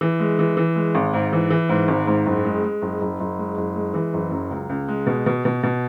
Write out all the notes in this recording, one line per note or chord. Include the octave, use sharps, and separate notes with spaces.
E3
G#3
E3
E3
G#3
G#1
G#2
E3
E3
G#2
G#1
G#2
F#1
G#3
G#3
F#1
F#1
F#1
G#3
F#1
G#3
E3
F#1
F#2
C#2
C#2
G#3
B2
B2
B2
B2